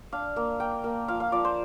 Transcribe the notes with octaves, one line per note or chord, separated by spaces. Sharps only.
D4 F5
A#3
A#3 G5
A#3
F3 F5
F5
F3 D5
C5